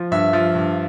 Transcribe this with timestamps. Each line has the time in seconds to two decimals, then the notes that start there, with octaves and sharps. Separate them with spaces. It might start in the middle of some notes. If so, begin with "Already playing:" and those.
Already playing: F3
0.11 G2 E5
0.33 F3
0.55 G2